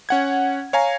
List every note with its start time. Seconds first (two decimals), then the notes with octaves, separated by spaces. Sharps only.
0.09 C#4 F#5 G#6
0.73 C#5 F5 G#5 A#5